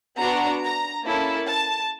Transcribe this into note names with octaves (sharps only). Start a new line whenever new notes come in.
B3 D4 F#4 A#5
A#5
A#3 C#4 E4 A4 A5
A5